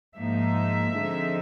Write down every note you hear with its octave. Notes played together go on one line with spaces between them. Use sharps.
G#2 F3 A#3 D#4 E5
D3 F3 G#3 C4 D#4